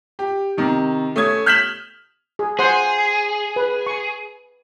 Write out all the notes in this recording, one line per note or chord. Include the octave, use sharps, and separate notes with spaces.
G4
C3 D#3
A3 C#4 D#6 G#6
F6 G6 B6 E7 F#7
G#4
G#4 C5 F#5 C6
B4
C#6